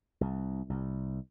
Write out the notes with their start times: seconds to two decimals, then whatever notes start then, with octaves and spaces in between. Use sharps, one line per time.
0.21 C2
0.70 C2